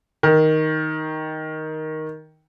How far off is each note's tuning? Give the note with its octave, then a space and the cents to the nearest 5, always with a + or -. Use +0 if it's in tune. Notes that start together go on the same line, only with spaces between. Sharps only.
D#3 +5